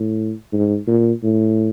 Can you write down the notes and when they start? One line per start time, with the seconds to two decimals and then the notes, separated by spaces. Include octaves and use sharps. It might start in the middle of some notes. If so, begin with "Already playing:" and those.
Already playing: A2
0.53 G#2
0.88 A#2
1.23 A2